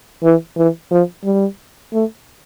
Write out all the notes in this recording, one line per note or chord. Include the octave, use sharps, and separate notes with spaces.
E3
E3
F3
G3
A3